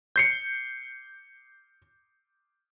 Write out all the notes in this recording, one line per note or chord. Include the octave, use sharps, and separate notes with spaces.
G6 C7 C#7